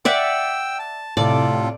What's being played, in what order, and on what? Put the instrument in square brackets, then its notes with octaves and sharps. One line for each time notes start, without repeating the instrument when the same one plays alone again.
[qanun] D5 E5 F#5 [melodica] G5 E6
[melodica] A5
[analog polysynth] A2 C3 [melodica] F4 A4 [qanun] D5